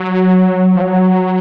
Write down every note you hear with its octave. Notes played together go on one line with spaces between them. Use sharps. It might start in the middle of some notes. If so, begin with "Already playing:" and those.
Already playing: F#3
F3
F#3